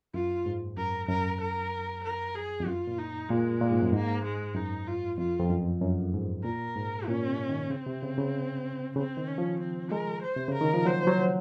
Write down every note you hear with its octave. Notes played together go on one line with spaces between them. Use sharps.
F#2 F4
G#2
F#2 A#4
F#2 A#4
A#4
A#4
G#4
F2
F#2 F4
A#2
D#4
A#2 G#3
A#2
G#2
F#2
G#2 A#3
G#3
F#2 D#4
F4
F2 F4
F2
F#2
F#2
G#2
A#2 A#4
G#2
A#2 C#4
C3
D#3
C#3 C4
C3
C#3
C#3
C#3 C4
D#3
C#4
F3
C4
G#3 A#4
C5
C3
C#3
A#4
D#3
F3
F#3 C5
F#3